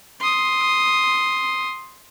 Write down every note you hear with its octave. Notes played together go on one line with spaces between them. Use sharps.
C6 D#6